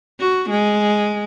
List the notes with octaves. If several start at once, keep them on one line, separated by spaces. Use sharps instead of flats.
F#4
G#3